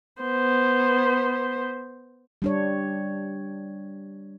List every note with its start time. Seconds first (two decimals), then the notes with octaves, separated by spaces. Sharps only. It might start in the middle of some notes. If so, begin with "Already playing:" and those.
0.22 B3 C5
2.42 G3 D4 C#5